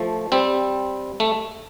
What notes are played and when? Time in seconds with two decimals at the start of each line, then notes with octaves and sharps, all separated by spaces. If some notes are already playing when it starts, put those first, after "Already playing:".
Already playing: F3 A3
0.32 G3 C4
1.20 A3